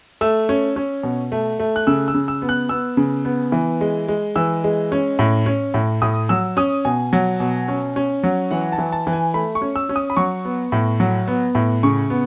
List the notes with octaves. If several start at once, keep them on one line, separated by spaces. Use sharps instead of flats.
A3 E6
C#4
C#4
B2
A3
A3
F#6
C#3 E6
E6
C#3
E6
B3
F#6
B3 E6
C#3
B3
E3
G#3
G#3
E3 E6
G#3
C#4
A2
C#4
A2
A2 D#6
F#3 E6
C#4 D#6
B2 G#5
F#3
B2
C#4
C#4
F#3
E3 F#5
A5
E3
A5
E3
G#5
A3 B5
C#6
C#4
E6
C#4
D#6
B5
F#3 C#6
B3
A2
F#3
B3
A2
C#3 C#6
B3